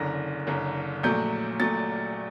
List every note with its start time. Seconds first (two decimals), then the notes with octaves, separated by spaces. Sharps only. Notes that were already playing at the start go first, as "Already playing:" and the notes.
Already playing: F#1 F#2 D3 A#6
0.47 F#1 F#2 D3
1.03 A#1 A#2 F#3 A3 G6
1.59 A#2 F#3 A3 A6